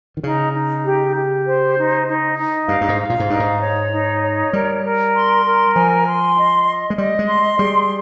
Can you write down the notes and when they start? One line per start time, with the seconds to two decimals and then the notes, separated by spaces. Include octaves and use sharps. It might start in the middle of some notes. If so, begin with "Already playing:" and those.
0.17 D#3
0.23 C#3 D#4
0.54 D#4
0.84 G4
1.16 G4
1.46 C5
1.77 D#4
2.07 D#4
2.38 D#4
2.68 G2 F5
2.81 G2
2.89 G#2
3.00 F5
3.10 A#2
3.20 G#2
3.30 G2 D#4
3.40 G#2
3.61 C#5
3.91 D#4
4.23 C#5
4.52 G3 A#4
4.83 A#4
5.14 C6
5.44 A#4
5.75 F3 G#5
6.07 C6
6.37 D#5
6.67 D#5
6.90 G#3
6.98 G3 D#5
7.19 G#3
7.28 C6
7.59 G3 G#4